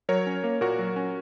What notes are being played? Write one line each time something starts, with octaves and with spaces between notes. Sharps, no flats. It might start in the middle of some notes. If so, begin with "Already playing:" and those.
F#3 A#4 C#5
C#4
A#3
A#2 F#4 A#4
F#3
C#4